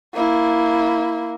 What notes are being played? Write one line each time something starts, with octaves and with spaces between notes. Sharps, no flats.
A#3 E4